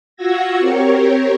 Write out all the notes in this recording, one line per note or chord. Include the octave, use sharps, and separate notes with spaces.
F4 F#4 F#5 E6 G#6 A#6
C4 G4 A#4 C#5